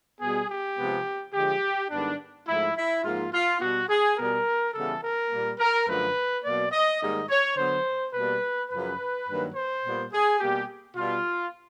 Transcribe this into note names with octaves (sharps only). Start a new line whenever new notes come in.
B2 G3 B3 G#4
G4
C3 F3 G#3 B3
D3 F3 G#3 G4
G#2 D#3 G3 B3 D4
G#2 F3 A3 E4
E4
G#2 F3 A#3 F4
F4
B2 G3 B3 F#4
G#4
B2 G3 B3 A#4
C#3 E3 G3 B3 A4
A#4
A#2 G3 A#3
A#4
F#2 D3 F3 A3 B4
B2 F#3 A#3 D5
D#5
G#2 D#3 G3 A#3 D#5
C#5
D3 F#3 B3 C5
B2 G3 A#3 B4
F#2 C#3 F3 B4
G2 D#3 F#3 A#3
C5
A#2 G3 B3
G#4
B2 G3 A#3 G4
B2 G3 B3 F4